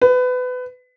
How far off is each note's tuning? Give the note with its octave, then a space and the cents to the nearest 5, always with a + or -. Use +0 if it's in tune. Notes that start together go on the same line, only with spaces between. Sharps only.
B4 +25